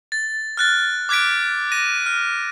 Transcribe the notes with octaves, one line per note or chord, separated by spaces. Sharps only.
A6
F6 F#6 A6
D6 F#6 G#6 B6 D7
A#6 D#7
F6